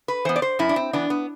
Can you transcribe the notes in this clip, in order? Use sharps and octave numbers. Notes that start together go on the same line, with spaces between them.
B4
E3 B3 C5
D5
C5
F#2 E4
D4
C4
E3 B3 D4
B3